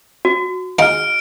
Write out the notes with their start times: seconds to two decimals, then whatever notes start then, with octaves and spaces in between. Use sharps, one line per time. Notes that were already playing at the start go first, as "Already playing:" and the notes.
0.25 F#4
0.79 G#3 D#4 F4 F6 D7